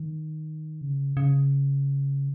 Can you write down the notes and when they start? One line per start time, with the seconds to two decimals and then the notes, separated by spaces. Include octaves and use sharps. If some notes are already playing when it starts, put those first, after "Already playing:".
Already playing: D#3
0.81 C#3
1.17 C#3